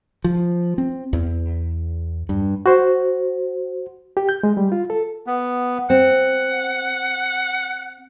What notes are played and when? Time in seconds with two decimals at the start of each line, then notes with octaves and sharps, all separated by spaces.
0.24 F3
0.78 C4
1.13 E2
2.29 G2
2.66 F#4 C5
4.17 G4
4.29 G6
4.43 G#3
4.57 G3
4.72 F4
4.90 A4
5.27 B3
5.90 C4 F#5